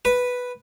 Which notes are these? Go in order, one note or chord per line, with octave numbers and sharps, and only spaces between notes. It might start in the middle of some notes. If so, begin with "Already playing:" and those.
B4